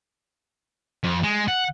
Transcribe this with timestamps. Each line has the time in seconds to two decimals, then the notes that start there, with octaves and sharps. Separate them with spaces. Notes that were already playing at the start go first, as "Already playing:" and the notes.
1.03 F2
1.23 G#3
1.48 F#5